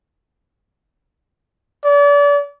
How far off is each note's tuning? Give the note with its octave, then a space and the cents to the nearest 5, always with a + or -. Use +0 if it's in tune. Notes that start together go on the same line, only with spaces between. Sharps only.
D5 -35